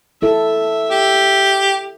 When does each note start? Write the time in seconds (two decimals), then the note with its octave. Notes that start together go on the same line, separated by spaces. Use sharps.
0.22 E4 A4 E5
0.91 G4